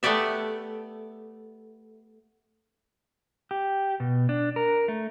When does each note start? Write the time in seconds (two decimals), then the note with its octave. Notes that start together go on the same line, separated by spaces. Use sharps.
0.03 A3 B3 G4 D5 E5
3.51 G4
4.00 B2
4.29 D4
4.56 A#4
4.88 A3